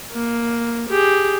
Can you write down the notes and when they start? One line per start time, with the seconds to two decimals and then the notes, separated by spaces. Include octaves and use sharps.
0.12 A#3
0.89 G4 G#4